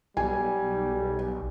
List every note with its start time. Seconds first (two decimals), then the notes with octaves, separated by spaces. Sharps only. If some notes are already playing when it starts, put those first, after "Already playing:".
0.17 B1 G3 G#5